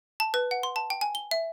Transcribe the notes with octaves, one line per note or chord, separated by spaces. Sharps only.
A5
B4
F#5
C6
A5
G5
G#5
G7
E5